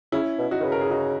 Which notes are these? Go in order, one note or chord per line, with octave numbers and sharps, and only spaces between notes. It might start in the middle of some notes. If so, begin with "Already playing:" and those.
C#3 C#4 E4
B2
D#4 F#4
D#3
C#3 B4
A#4
G#4
D#4 F#4